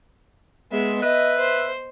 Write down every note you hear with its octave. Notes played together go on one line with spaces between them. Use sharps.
G#3 B3 E5
B4 D#5 E5
C5